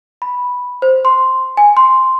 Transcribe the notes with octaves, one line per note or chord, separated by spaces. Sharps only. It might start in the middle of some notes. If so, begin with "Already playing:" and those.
B5
C5
C6
G#5
C6